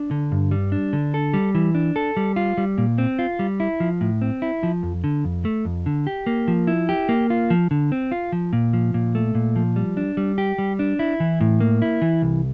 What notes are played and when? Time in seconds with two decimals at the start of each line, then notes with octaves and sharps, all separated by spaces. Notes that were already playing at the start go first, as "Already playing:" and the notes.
Already playing: D4
0.11 D3
0.32 G2
0.51 G3
0.72 D4
0.93 D3
1.14 A4
1.34 G3
1.55 E3
1.75 D4
1.96 A4
2.17 G3
2.36 F4
2.58 G3
2.78 A#2
2.98 C4
3.19 F4
3.39 G3
3.60 E4
3.80 F3
4.01 A2
4.22 C4
4.42 E4
4.63 F3
4.83 F2
5.04 D3
5.24 F2
5.45 A3
5.65 F2
5.86 D3
6.07 G4
6.27 A#3
6.48 F3
6.67 E4
6.89 G4
7.09 A#3
7.30 F4
7.50 F3
7.71 D3
7.92 C4
8.12 F4
8.32 F3
8.53 A#2
8.73 F3
8.94 A#2
9.15 A3
9.35 A#2
9.56 F3
9.76 G3
9.97 D4
10.17 G3
10.38 G4
10.58 G3
10.79 D4
10.99 E4
11.20 E3
11.41 A2
11.60 A#3
11.82 E4
12.02 E3
12.22 C2